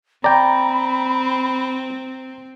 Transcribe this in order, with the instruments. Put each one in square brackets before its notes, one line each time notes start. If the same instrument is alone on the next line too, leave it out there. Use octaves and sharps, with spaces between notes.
[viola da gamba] C4 [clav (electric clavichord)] D5 G5 [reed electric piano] A#5 [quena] B5